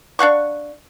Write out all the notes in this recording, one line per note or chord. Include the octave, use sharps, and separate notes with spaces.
D4 F5 F#5 C#6